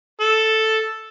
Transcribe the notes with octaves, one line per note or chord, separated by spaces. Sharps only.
A4